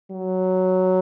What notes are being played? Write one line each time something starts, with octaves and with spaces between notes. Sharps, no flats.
F#3